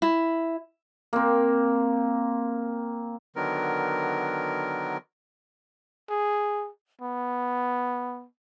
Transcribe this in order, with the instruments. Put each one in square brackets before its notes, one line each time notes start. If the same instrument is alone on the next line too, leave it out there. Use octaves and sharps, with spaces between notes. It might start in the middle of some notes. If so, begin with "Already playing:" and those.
[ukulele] E4
[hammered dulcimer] A#3 C4
[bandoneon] D3 D#3 F#3 B3 A#4
[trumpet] G#4
B3